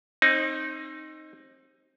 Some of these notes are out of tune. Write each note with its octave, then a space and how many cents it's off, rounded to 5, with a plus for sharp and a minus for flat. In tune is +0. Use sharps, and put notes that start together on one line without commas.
C4 +30 D#4 +0